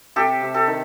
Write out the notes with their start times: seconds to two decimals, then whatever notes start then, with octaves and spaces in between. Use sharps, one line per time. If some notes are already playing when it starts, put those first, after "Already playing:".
0.16 C3 G4 A4
0.42 C3
0.54 G4 A4
0.67 D#3